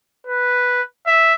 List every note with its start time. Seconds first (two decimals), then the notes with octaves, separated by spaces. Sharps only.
0.27 B4
1.07 E5